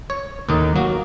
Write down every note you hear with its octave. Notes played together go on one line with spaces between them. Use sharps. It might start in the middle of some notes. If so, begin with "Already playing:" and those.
C#5
D#2 A2 D#3 D#4
F#3 A#3 F#4